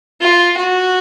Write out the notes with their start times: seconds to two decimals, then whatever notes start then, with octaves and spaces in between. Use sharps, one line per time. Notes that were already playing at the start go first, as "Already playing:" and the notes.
0.21 F4
0.57 F#4